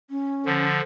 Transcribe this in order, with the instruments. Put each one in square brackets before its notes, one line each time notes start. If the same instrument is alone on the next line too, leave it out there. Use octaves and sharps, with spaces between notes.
[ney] C#4
[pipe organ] D3 F3